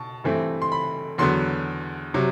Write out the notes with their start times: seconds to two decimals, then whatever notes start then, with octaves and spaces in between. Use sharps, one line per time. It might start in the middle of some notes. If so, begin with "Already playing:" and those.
Already playing: B2 A5
0.24 G2 E3 A3 C4
0.62 C6
0.72 B5
1.18 E2 D3 F#3 B3 C6
2.14 C3 F#3